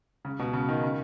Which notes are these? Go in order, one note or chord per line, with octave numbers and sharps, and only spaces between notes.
C#3
B2
C#3
D#3
C#3